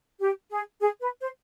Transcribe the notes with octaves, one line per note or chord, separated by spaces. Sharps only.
G4
G#4
G#4
B4
C5